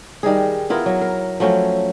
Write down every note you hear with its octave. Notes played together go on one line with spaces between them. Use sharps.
D#3 G3 D#4 G#4
B3 E4 F4 A#4
F#3
A#4
F3 F#3 A3 C#4